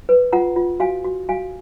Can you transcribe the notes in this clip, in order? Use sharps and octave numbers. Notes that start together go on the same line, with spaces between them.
B4
F4 F#5 A#5
F4
F#4 F5 G#5
F#4
F#4 F5 G#5